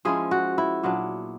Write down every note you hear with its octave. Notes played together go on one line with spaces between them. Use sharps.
F3 G#3 C#4 E4 G#4
F#4
E4
A#2 F#3 B3 D4